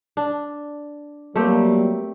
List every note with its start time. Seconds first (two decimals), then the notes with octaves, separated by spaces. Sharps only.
0.17 D4
1.36 F#3 G3 A3 A#3 C4 G4